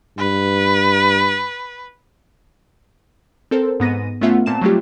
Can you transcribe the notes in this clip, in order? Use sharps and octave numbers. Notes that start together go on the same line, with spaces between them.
G2 B4
C4 A4 A#4 C5
G#2 B3 A#6 D#7
A3 B3 C#4 F4 E5 F#5
A#2 C4 A5 E7
F#3 G3 A3 F4 G4